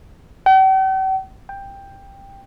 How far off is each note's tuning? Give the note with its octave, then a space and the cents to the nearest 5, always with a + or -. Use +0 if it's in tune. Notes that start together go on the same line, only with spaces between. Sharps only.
G5 -45
G5 +10